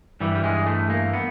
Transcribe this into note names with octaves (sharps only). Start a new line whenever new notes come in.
G2 E3 G3
G3
G#3
A3
A#3
B3